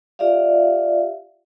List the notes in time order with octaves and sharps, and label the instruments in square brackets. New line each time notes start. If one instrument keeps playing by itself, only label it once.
[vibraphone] F4 G4 D5 E5 F5